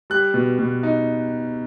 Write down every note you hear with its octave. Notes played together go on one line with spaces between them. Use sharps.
G3 F#6
B2
B2
D#4